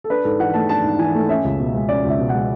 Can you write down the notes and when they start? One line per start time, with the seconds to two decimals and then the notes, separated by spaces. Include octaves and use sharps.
0.04 A4
0.10 D4 B4
0.24 G#2 A4
0.40 E3 F#5
0.54 A3 A5
0.69 D4 A5
0.84 G#2
0.99 E3 G#5
1.15 A3
1.29 C#4 E5
1.44 C#2
1.60 B2
1.74 G#3
1.88 C#4 D5
2.05 C#2 E5
2.19 B2
2.29 F#5
2.35 G#3